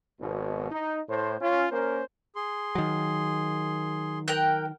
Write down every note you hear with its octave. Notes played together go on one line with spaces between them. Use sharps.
G#1 B2
D#4
A2 C5
C#4 F4
A#3 C#4 A#4 C5
G#4 C6
D#3 F#3
A#4 G5 F#6